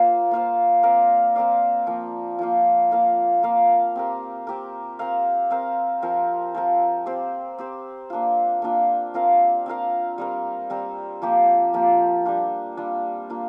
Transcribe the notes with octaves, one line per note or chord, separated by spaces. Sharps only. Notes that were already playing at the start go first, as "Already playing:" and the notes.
Already playing: A#3 F4 C5 F5
A#3 F4 C5 F5
C4 A#4 D5 F5
C4 A#4 D5 F5
F3 A#3 F4
F3 A#3 F4
A#3 F4 A#4 F5
A#3 F4 A#4 F5
C4 G4 A#4
C4 G4 A#4
C4 A#4 F5
C4 A#4 F5
F3 C4 A#4
F3 C4 A#4
C4 G4 C5
C4 G4 C5
A#3 D4 F4
A#3 D4 F4
C4 F4 A#4 F5
C4 F4 A#4 F5
G3 C4 A#4
G3 C4 A#4
F3 A#3 G4
F3 A#3 G4
G3 D4 F4
G3 D4 F4
A#3 D4 F4